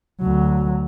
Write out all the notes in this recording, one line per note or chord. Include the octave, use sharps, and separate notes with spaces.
D2 F#3